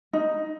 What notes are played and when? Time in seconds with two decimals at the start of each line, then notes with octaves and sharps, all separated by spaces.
0.13 D#4